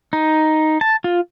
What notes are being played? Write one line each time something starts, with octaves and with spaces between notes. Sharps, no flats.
D#4
A5
F4